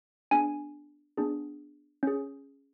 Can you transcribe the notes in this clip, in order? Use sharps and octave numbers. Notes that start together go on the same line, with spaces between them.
B3 D4 G#4 G#5
B3 D4 G#4
C#4 G#4